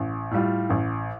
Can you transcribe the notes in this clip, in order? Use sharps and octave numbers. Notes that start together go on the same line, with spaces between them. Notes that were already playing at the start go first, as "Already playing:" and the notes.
Already playing: A1
A2 G3 F4
A1